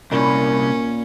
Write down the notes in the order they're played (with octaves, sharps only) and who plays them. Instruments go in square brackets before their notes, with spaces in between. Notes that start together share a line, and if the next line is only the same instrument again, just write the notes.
[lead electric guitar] C2 [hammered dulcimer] A#2 B5 C#6 [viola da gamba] C#4